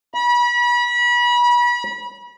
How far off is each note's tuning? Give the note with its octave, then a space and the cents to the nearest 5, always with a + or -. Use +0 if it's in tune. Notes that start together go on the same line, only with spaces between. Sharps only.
B5 -35